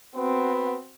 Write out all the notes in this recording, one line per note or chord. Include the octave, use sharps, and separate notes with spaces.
B3 C4 F#4